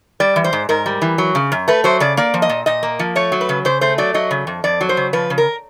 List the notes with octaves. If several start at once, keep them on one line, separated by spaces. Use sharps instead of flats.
G3 D5
E3
C5
G#2
G#2 A#4
G3
E3
F#3
C#3
F#2
A3 B4
F#3 C5
C#3 D5
A#3 D5
F3
D#5
A#2
A#2 D#5
A#3
F3
A3 C#5
F#3
B4
C#3
C#3 C5
A3 C5
F#3 D5
F#3 D#5
C#3
F2
F2 D5
F#3
C5
C#3
F3 B4
C#3
A#4